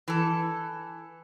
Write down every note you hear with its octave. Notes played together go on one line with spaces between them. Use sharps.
E3 A4